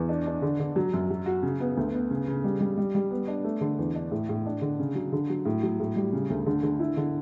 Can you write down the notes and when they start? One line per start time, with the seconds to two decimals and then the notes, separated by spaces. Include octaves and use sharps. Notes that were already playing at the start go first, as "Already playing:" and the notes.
Already playing: E2
0.09 D4
0.26 D4
0.42 D3
0.60 D3
0.76 F#3
0.94 F#2
1.10 F#3
1.26 F#4
1.43 C#3
1.60 B3
1.77 D2
1.94 B3
2.10 C#3
2.28 C#3
2.44 G3
2.60 G3
2.78 G3
2.95 G3
3.10 B3
3.28 D4
3.44 A3
3.61 D3
3.78 E2
3.95 D4
4.11 A2
4.29 A2
4.46 D4
4.61 D3
4.79 C#3
4.95 F#3
5.12 D3
5.30 F#3
5.45 A2
5.63 F#3
5.80 A2
5.96 G3
6.13 C#3
6.30 D2
6.46 D3
6.63 D3
6.79 E4
6.97 D3